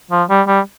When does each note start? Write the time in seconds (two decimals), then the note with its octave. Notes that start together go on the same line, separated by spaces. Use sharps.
0.11 F3
0.30 G3
0.48 G3